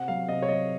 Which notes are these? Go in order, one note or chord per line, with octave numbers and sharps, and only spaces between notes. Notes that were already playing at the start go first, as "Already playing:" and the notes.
Already playing: C3 F#5
F#3 F5
C3 D#5
C#5
F#3 D#5